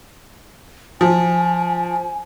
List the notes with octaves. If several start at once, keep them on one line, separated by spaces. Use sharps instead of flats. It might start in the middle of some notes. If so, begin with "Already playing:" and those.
F3 G#5